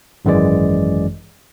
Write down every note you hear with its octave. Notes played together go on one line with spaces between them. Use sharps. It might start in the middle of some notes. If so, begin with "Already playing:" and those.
G#1 F#2 E3 G#3 D5